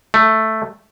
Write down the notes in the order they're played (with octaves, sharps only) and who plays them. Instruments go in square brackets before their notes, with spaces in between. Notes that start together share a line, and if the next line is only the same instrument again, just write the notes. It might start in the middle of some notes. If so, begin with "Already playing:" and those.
[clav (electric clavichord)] A3